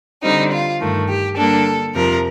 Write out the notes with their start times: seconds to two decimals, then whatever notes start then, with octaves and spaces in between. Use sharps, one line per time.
0.23 D3 G3 C4 D#4
0.52 F4
0.80 G2 D#3 A3
1.08 G4
1.37 D3 G3 A#3 D4 A4
1.94 F2 C3 F3 A#4